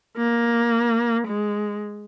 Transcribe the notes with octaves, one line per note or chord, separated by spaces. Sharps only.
A#3
G#3